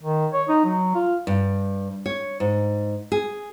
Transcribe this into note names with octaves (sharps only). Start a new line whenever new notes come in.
D#3
C#5
D#4
F#3
F4
G2
C#5
G#2
G#4